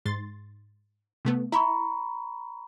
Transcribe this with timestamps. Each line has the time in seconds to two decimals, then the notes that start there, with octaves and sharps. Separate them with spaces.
0.05 G#2 C6 A6
1.25 C3 A3 B3
1.52 E4 E5 A#5 B5 C#6